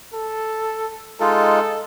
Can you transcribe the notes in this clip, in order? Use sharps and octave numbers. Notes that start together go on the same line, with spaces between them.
A4
G#3 D#4 F4 A4